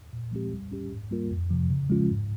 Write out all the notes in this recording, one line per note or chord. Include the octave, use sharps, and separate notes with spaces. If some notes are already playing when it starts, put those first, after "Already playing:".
A#2
F3 G#3 C4 G4
G3
C#4 G4
G#2
G3 A#3 F4 A#4
F2
C3 F3
C#3
F3 G#3 C#4 F4
G#2